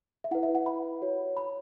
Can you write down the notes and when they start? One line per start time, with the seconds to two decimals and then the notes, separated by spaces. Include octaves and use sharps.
0.24 E5
0.31 E4 B4 F#5
0.43 E5
0.55 F#5
0.66 B5
1.02 F#4 C#5
1.37 B5